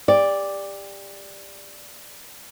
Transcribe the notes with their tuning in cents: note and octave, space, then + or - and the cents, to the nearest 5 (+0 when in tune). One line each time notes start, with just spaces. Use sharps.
G4 +30 D5 +0